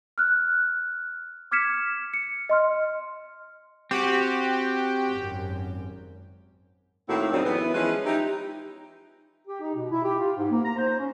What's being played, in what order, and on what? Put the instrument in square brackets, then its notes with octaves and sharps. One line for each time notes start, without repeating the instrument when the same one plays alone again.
[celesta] F6 F#6
D6 F6 G#6 B6 C#7 E7
C#7
D#5 C6 F6
[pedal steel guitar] C4 F#4 [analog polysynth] G4
[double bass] G#1 F#2
[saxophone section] A2 D#3 A#3 C4 E4 F#4
F#2 C#3 F#3 G3 C4 D#4
E3 B3
E3 F3 G#3 C#4 B4
D#4 E4 G4
[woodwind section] G4
D#4
B2
E4
G4
F4
G#2
A#3
A#5
C5
C#4